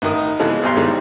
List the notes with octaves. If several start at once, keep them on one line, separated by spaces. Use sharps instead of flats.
A1 D#3 D#4 A#4 D#6
C#3 E3 F3 G#3 B3
B1 B2 C4 G4 A#5 C6
D#3 E3 G3 G#3